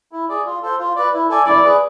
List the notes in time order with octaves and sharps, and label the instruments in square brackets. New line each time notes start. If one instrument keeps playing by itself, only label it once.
[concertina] E4
G#4 D5
F4
A4 C5
F4
B4 D5
E4
A4 D5 G#5
[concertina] E4 [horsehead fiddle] D5
[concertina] G#4 B4